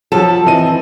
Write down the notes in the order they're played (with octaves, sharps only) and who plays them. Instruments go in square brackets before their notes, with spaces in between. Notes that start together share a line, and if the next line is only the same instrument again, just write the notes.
[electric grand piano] F3 [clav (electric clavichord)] F#3 [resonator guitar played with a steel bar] A4
[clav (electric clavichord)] E3 [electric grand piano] C4 D#5 D#7